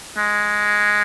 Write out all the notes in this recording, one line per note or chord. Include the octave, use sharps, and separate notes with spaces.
G#3